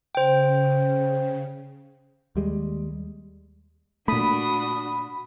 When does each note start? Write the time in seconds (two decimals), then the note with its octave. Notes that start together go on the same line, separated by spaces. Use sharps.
0.15 C#3 C5 G5
2.36 D#2 G3 G#3
4.08 A#2 A3 D4 F#4 B5 D#6